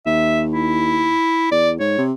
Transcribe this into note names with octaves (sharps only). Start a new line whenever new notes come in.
D#2 E5
E4
E2 D5
G#2 C#5
C3